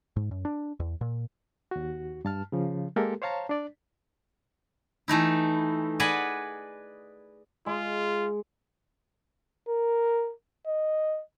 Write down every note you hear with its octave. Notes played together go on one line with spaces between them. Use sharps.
G#2
F#2
D4
E2
A#2
D#2 F#4
G2 A5 F6
C#3 F3
G#3 A#3 G4 A4 A#4
C5 C#5 F5 A5 A#5
D4 D5
E3 A3 D#4 E4
G#4 B4 D5 D#5 F#5 G#5
G#3 F4
A#4
D#5